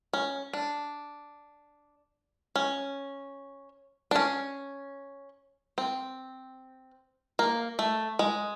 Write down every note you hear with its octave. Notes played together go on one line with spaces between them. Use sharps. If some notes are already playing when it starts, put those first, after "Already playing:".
C#4
D4
C#4
D4
C#4
C4
A#3
A3
G#3